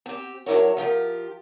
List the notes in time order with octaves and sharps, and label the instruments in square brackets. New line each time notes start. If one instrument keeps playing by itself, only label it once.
[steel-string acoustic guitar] C4 G4
F#3 D4 E4 A#4 C#5
F3 F4 G4 A#4